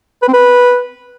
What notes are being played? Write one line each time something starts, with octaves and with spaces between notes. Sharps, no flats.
B4
C4
B4